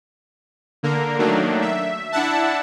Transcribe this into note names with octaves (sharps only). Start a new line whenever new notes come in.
D3 A#3 A#4
D#3 F#3 A3 A#3 D4
E5
D4 E4 E5 F#5 A5